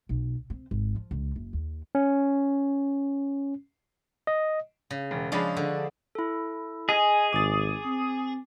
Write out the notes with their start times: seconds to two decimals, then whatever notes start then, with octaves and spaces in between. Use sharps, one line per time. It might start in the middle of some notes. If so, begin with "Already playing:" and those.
0.09 B1
0.50 C4
0.71 G#1
0.96 F3
1.11 C#2
1.36 F#1
1.53 D#2
1.95 C#4
4.27 D#5
4.91 C#3
5.11 E1
5.32 F3 G#3 C#4 D4 G#4 B5
5.57 D3
6.15 E4 A4
6.89 G#4 D#5 G#5
7.33 G#1 D6 A6
7.85 C4